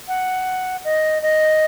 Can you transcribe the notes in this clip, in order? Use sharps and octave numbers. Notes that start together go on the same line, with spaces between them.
F#5
D#5
D#5